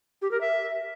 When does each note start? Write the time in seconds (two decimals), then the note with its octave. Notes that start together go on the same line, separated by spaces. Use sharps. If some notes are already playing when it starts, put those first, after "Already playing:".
0.22 G4
0.31 A#4
0.41 E5